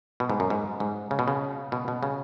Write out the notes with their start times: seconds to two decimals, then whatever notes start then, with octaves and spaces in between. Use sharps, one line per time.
0.20 B2
0.30 G#2
0.40 F#2
0.50 G#2
0.80 G#2
1.11 C#3
1.19 B2
1.28 C#3
1.72 B2
1.88 B2
2.03 C#3